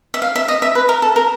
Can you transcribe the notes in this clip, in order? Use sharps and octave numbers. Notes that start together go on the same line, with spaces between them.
E5
F5
E5
D#5
E5
B4
A#4
A4
A#4